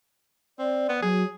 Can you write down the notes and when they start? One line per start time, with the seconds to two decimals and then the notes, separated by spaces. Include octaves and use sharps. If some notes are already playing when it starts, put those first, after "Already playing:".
0.59 C4 D5
0.89 B3
1.02 F#3 G#4